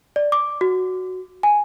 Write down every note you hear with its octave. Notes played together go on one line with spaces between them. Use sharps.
D5
D6
F#4
G#5